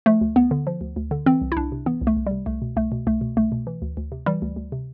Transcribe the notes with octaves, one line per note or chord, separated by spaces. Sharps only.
F3 A3
D2
D2 B3
D3
F3
D2
D2
D3
E3 C4
C2
E4
C2 D4
C3
E3 B3
C2
A3
C2
C3 G3
C2 A3
B2
C2 A3
B2
C2 A3
B2
C2 A3
B2
E3
D2
D2
C3
E3 G3
D2
D2
C3